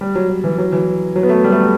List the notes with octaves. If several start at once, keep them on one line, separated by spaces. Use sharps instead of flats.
G3
F#3
F#3
E3
F#3
E3
F#3
B3
A3
G3
A3
G3